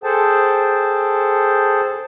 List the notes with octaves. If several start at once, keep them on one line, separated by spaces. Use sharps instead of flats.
G#4 A4 C5 G5 A5